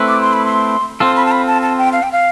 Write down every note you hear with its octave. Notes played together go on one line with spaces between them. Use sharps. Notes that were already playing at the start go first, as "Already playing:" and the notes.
Already playing: A3 C4 E4 B4
D6
C6
B5
C6
C4 F4 A4 C6
B5
A5
B5
A5
A5
G5
F5
G5
F5